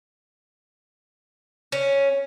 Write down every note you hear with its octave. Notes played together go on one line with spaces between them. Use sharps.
C#4